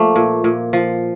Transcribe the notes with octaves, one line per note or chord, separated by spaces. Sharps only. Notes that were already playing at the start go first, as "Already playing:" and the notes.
Already playing: F3 A3 A#3
A#2
A#2
F3